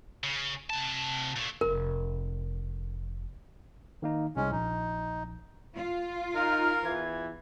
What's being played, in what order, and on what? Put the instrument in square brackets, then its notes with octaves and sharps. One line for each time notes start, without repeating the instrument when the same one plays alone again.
[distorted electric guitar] C#3
C3 A5
A#2 A3
[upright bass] F1 [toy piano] A#4
[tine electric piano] D#3 A#3 D#4
[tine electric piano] C2 [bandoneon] G#3 C#4
[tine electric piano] A#1 [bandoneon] D#4
[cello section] F4
[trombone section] D#4 [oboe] A#4 [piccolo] F6
[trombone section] E2 E3 [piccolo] G#6